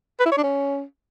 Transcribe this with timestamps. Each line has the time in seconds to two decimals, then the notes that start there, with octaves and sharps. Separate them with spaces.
0.20 B4
0.26 E4
0.31 C#5
0.37 D4
0.43 C#4